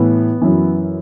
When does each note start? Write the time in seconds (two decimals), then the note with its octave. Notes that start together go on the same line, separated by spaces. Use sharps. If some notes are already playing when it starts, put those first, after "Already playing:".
Already playing: A2 E3 B3
0.42 F#2 E3